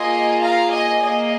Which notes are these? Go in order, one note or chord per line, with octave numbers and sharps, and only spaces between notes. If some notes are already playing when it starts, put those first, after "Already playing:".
Already playing: A#3 F4 G#4 D#5 G#5
F5 A#5
D#5 G#5
A#3 G#4 D#5